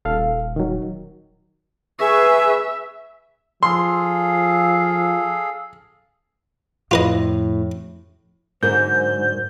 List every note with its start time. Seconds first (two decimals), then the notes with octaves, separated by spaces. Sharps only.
0.05 D#1 A4 F5
0.56 D#3 F#3
1.99 G#4 B4 E5 C#6
3.63 F3 G#4 A4 F5 C6
6.91 F2 A2 F4 B4 D#5
8.63 G#2 D3 F#3 A#4 C5 G6